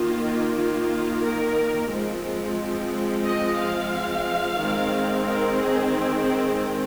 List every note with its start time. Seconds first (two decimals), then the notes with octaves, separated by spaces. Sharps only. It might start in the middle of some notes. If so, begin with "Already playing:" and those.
Already playing: D#3 A#3 F4
0.55 F4
1.23 A#4
1.90 F3 G#3 C4
3.24 D#5
3.59 F5
4.59 D#3 G#3 C4
5.27 A#4
5.61 G#4
5.95 G#4